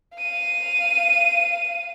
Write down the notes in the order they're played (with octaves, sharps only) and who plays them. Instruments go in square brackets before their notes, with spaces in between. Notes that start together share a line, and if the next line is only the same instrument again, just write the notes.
[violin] F5 D#7